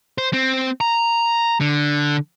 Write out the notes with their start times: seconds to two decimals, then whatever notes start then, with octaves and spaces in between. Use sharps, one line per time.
0.18 C5
0.33 C4
0.81 A#5
1.61 D3